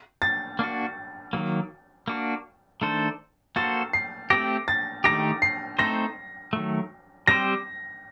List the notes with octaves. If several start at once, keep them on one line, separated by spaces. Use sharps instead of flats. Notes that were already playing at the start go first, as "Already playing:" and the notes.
A6
A#3 D4 F#4
D#3 F#3 A#3
A#3 D4 F#4
D#3 A3 D4 A4 C5
A#3 F#4 A4 C5 A6
C7
A3 C4 G4 A#6
A6
D#3 A3 D#4 G4 A#6
C7
A3 C4 D#4 A4 C5 A#6
D#3 F#3 A3
G3 C4 G4 C5 A#6